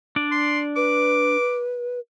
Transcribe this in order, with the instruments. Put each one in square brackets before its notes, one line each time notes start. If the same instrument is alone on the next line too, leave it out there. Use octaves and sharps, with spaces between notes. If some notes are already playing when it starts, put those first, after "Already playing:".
[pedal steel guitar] D4 D5
[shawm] C6
[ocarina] B4 [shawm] D6